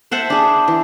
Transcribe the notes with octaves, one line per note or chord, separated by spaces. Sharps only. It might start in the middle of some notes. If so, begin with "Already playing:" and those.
C5 E5 F#5 A5
D4 G#4
E3